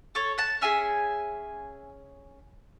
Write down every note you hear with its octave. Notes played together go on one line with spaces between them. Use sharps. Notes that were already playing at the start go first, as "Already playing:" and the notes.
A4 C#5
F#5 A5
C#4 G#4 E5 G#5